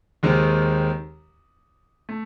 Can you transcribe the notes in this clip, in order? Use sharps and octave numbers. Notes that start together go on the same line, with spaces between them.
D#2 D#3 G#3 C4
A3